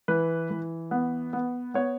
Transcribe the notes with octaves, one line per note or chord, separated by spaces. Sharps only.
E3 B4
E3
B3
B3
B3 C#5